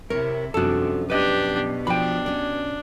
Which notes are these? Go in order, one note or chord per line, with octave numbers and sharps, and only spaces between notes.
C3 E4 A#4 C#5
F#2 C3 F3 G3 D4 F#4 A4
B2 D4 G4 B4 D#5
F3 D4 G5 B5
C#4 D5